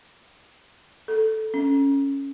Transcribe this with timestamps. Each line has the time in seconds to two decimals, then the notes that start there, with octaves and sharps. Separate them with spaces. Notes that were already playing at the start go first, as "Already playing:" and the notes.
1.08 A4
1.54 C#4